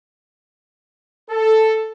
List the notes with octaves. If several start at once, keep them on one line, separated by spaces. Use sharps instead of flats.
A4